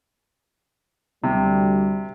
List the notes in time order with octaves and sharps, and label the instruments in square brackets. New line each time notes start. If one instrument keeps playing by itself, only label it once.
[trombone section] D2 G3 [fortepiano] C3